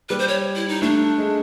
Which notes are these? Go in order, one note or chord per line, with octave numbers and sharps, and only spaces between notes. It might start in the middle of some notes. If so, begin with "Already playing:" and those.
G3 B4
C5
C#5
E4
D#4
A3 D4
G#3